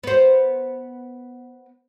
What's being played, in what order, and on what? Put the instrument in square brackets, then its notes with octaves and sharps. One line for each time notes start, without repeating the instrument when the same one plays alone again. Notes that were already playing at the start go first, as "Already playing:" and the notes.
[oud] B3 C5